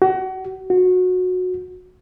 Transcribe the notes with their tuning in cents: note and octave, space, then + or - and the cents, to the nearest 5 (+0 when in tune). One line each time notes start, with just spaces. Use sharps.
F#4 +30
F#4 -20